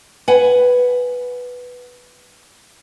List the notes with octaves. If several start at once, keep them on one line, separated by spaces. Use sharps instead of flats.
B4 F#5 G#5